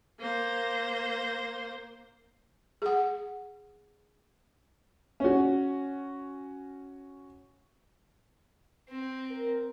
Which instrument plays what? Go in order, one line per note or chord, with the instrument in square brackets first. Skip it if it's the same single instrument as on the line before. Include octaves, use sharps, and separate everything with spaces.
[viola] A#3 C5
[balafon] G#4 F#5
[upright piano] C#4 F#4
[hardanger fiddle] C4
[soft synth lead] A#4